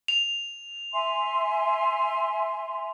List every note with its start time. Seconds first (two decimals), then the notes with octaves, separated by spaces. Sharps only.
0.08 F7
0.93 E5 G#5 C6